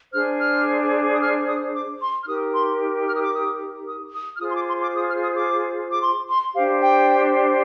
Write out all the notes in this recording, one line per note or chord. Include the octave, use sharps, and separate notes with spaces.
D4 G#4 C5 F6
F6
D#6
F6
D#6
D6
C6
F6
D#4 G4 A#4 D#6
C6
F6
D#6
D6
D#6
D#6
D#6
F6
F4 G#4 C5 D#6
C6
D6
C6
D6
D#6
F6
D#6
D6
D6
C6
C6
D4 G4 C5 F5
G5